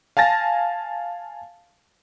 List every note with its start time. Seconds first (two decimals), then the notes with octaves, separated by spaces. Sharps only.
0.17 F5 G#5 A5 A6 A#6